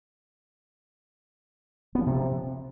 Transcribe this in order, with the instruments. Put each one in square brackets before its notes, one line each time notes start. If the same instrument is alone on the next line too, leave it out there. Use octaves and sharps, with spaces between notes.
[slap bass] B3
F3
C3